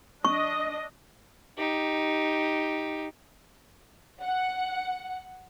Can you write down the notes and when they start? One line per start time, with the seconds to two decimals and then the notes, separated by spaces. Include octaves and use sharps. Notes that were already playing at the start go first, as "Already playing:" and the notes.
0.25 D4 D#5 C#6
1.57 D#4 G4
4.21 F#5